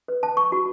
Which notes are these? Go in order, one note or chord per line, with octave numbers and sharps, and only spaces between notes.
B4
A5
C#6
F#4